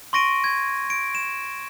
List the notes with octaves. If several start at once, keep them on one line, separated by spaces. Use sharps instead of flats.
C6 C#6 A#6 D7 D#7
G#6
D7
E7